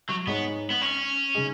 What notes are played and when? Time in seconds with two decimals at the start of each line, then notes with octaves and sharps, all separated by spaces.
0.09 F#3
0.26 G#2 G#3 B3 D#4 G#4 C#5
0.70 B3
0.81 C#4
1.35 C#3 G#3 D#4 G#4